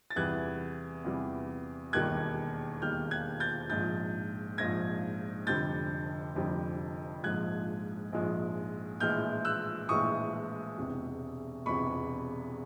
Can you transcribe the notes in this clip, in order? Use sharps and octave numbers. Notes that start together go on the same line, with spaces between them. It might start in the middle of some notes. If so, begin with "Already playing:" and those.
A6
E2 C3 E3 G3 F#6 G#6
E2 C3 E3 G3
E1 D#2 D#3 G3 F#6 G#6
E1 D#2 D#3 G3 F6 G6
F#6 G#6
G6 A6
A#1 G#2 F3 G6 A6
A#1 G#2 F3 G#6 A#6
F1 F2 D3 G3 G6 A6
F1 F2 D3 G3
A#1 G#2 F3 G#3 F#6 G#6
A#1 G#2 F3 G#3
A#1 A2 E3 G#3 F6 G6
E6 F#6
A#1 A2 E3 G#3 C#6 D#6
E1 E2 C3
E1 E2 C3 B5 C#6